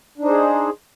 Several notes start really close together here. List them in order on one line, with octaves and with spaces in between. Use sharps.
D4 D#4 C5 G#4